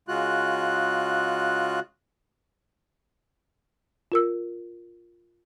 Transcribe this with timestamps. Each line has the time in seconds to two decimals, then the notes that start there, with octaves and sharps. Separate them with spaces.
0.08 C#3 G#3 F4 F#4 F#6
4.12 F4 A#4 E6